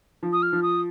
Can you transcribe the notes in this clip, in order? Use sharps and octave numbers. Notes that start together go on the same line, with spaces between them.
F3
D#6
F6
F3
D#6